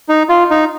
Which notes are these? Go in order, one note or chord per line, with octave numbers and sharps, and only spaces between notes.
D#4
F4
D#4